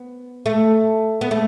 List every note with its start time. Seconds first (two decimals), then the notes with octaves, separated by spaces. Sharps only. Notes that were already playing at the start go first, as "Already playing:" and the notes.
Already playing: B3
0.46 A3
1.21 B3
1.31 A3